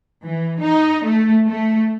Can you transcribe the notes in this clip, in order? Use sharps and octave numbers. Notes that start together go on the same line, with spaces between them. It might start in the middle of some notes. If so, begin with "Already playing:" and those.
E3
D#4
A3
A3